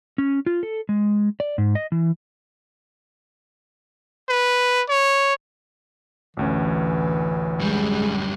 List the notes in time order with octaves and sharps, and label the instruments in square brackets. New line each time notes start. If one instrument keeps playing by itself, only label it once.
[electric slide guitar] C#4
F4
A4
G#3
D5
G#2
D#5
E3
[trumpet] B4
C#5
[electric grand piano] A1 D2 C#4 [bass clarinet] E3
[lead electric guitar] F#2 G3 [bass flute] G#3